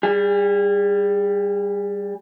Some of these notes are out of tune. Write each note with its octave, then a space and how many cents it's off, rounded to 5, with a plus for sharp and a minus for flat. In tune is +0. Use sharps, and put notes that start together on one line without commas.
G3 +0 G#4 -35